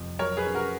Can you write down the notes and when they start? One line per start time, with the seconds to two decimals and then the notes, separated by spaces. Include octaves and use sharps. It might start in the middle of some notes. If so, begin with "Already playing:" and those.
Already playing: F1 F2
0.19 F#3 A#4 C#5
0.37 G#4 B4
0.46 C#4
0.55 F#4 A#4